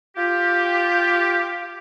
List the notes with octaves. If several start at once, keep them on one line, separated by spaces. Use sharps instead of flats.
F4 G4